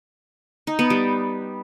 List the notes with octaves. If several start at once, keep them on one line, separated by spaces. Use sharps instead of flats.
D#4
B3
G3